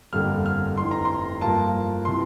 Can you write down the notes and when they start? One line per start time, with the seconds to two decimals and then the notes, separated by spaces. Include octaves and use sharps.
0.13 G1 F2 D3 G3 A#3 F6
0.46 F6
0.77 F1 F2 E3 C6
0.91 A#5
1.05 C6
1.41 G2 F3 A#3 F4 A5
2.05 C3 E3 C6